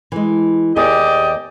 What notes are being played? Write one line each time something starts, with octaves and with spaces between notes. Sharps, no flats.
E3 G#3
D#2 B3 G4 G#4 D5 D#5